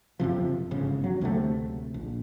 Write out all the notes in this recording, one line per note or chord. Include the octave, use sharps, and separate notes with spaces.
F#1 F2 C3 F3
G1 G#2 C#3
F#3
D2 C3 F#3 A3
A#1